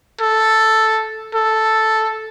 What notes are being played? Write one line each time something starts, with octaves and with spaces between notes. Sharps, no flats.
A4
A4